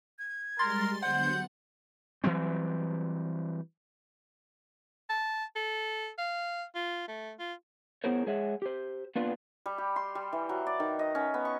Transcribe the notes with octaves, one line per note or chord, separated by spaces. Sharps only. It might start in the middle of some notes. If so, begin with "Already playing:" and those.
G#6
G3 G#3 A#4 C6 A6
D3 F#3 B3 C5 F#5 G6
E3 F#3 G3 C4
A5
A4
F5
F4
A3
F4
B3 E4 G#4 A#4 C5 C#5
G#3 G#4 C#5 E5 F#5
G4 C5
A#3 B3 D4 F4 B4
G3
G4
C6
G3
E3
F#3
D5
D#3
D#5
C#4
B3
C#6